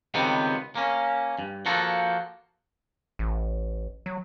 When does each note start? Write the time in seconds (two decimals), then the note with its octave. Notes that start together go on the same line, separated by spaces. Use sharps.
0.14 C#2 C3 D#3 G3 B3 C4
0.75 A#3 C#4
1.39 G2
1.66 F3 A#3 F#4 A4
3.19 A1
4.06 F#3